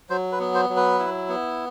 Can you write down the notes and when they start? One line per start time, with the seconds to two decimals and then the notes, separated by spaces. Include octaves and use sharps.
0.10 F#3 C5
0.32 B4
0.39 B3
0.54 C5
0.69 F#3
0.76 B4
0.99 E4
1.29 B3